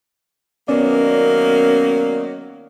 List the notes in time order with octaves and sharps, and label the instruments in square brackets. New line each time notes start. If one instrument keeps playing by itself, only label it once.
[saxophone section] D#3 F#3 A#3 [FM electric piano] B3 C#4 D5